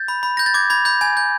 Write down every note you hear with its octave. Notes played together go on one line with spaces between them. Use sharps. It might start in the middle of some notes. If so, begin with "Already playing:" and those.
Already playing: G6 A6
B5
B5
G6 A#6
A6
D6 G#6
B5 G#6
B5 G6
G#5 G#6
G6